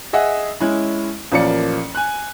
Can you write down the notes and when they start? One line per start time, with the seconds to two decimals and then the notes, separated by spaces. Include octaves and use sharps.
0.13 G#4 D#5 E5 F#5
0.61 G#3 C#4 E4
1.32 A1 F3 A#3 A#4 D5 C#7
1.95 G#5 F#6